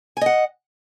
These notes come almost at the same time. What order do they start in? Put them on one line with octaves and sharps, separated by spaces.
G#5 D#5 F#5